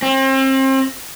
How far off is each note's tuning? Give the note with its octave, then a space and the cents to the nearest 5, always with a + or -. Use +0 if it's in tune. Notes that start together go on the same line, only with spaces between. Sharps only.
C4 +35